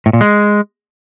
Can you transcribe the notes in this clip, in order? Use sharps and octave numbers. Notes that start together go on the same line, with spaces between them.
A2
A#2
G#3